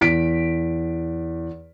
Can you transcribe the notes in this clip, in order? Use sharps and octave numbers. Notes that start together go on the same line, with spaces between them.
E2 B6 D7